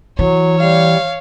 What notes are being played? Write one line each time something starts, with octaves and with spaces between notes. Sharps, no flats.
E3 F#3 C#5
G3 F5